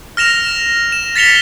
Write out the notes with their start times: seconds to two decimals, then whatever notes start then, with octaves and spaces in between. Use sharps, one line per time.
0.17 F6 A#6 E7 F7
0.92 E7
1.16 A6 B6 C#7 F7 G7